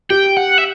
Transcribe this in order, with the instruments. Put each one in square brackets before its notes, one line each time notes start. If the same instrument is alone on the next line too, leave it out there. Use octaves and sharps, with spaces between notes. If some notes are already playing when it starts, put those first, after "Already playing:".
[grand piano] G4 [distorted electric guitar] G5
[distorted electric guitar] F#5
E5